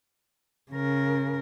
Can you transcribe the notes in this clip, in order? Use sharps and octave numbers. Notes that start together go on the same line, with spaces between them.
C#3 A#4